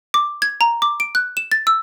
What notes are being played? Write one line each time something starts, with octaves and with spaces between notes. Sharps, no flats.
D6
G#6
A#5
D6
D7
F#6
E7
A6
E6